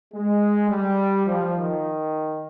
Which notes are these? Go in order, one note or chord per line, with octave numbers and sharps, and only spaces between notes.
G#3
G3
F3
D#3